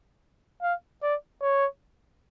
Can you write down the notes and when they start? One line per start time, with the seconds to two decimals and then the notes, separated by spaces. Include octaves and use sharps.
0.62 F5
1.02 D5
1.42 C#5